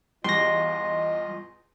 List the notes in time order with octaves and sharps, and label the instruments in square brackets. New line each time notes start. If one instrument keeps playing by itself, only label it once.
[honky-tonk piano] E2 [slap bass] G3 [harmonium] F4 D#5 [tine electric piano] C6 A#6